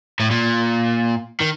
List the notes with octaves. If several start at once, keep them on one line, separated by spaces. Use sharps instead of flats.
A2
A#2
D#3